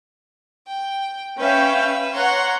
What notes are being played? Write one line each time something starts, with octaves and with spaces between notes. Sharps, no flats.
G5
C#4 B4 E5 F5 G5
C#5 F#5 A#5 C6